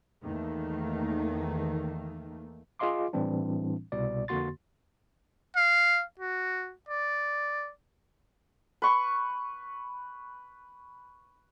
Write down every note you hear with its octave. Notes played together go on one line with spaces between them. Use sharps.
E2 D#3 A3 A#3
F4 G#4 D#5 F5 C6 D6
A2 E3 G3 C4 D4
C2 B2 D5
F2 D3 A#3 F#4 C6 A6
F5
F#4
D5
B4 C#6